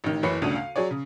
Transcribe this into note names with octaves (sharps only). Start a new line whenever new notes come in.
A1 D#3
F#1 E3 C#5 B5 C7 C#7
G1 D2 C#3 D4 D#7
F5
F#3 G#4 C#5 D5
C#3